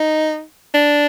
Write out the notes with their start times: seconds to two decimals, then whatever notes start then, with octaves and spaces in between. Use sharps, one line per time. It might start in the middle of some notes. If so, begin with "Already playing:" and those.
Already playing: D#4
0.74 D4